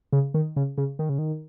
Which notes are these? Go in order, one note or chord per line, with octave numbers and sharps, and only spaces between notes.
C#3
D#3
C#3
C#3
D#3
C#3
D#3